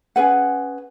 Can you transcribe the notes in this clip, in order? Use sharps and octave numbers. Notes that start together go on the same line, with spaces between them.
C#4 G#4 B4 F#5